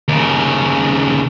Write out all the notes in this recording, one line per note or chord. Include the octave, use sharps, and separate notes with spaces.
D#2 C#3